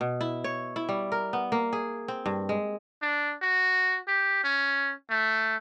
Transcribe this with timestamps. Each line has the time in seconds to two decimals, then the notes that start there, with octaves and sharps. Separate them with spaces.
0.01 B2
0.21 E4
0.44 C#5
0.76 E4
0.89 G3
1.12 A#4
1.33 B3
1.52 A#3
1.73 G#4
2.08 C4
2.26 G2
2.49 G#3
3.02 D4
3.42 F#4
4.08 G4
4.44 C#4
5.10 A3